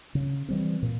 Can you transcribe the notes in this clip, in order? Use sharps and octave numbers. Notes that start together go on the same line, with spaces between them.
C#3
E3 G3 C4
A#2